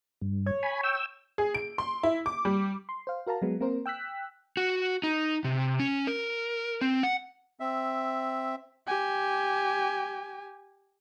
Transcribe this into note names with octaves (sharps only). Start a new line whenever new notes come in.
G2
C#5
G#5 B5
G5 E6
G#4
D7
C6
E4
D6
G3
C6
C5 F5
F#4 A#4 F5 A5 A#5
F#3 G#3 B3
A#3 C4 A#4 C5
G5 E6 F#6 B6
F#4
D#4
C3
C#4
A#4
C4
F#5
C4 E5
G4 G#5